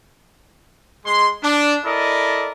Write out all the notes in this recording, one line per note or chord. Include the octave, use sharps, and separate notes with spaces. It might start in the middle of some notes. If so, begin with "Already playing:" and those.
G#3 C6
D4
E4 A4 A#4 D5 D#5